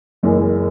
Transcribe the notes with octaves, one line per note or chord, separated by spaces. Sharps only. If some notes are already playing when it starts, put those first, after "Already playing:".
F#1 F#2 E3 G#3